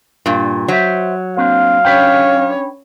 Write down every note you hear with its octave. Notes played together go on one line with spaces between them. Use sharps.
G2 A#2
F#3 C5 E5
A#3 C4 D4 F5
C#4 D4 B4 C#5 G5